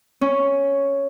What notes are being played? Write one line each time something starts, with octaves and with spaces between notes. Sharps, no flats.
C#4